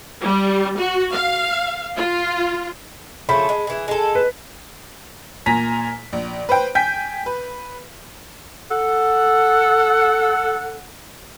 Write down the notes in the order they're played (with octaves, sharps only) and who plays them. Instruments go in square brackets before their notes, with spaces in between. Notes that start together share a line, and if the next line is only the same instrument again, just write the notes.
[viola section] G3
F#4
F5
F4
[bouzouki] C#3 F3 A3 [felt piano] B5
[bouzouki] G#3
E3 G#4
G#3 A4
[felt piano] B4
[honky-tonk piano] A#2 G#5 A#5 B6
A#1
B4 C5 G5
G5 G#5 G6 B6
B4
[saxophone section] A4 F#5